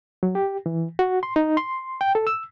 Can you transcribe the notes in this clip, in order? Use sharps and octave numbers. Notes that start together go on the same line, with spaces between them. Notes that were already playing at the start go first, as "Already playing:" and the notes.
F#3
G4
E3
F#4
C6
D#4
C6
G5
A4
E6